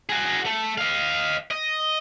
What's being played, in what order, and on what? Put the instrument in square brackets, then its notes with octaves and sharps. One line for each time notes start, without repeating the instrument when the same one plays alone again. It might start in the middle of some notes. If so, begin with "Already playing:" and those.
[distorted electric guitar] F#4 G#4
A3
D#5 F5
D#5